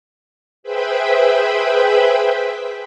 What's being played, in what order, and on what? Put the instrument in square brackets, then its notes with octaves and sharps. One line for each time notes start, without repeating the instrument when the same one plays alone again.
[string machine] G#4 B4 C5 E5 G5 B5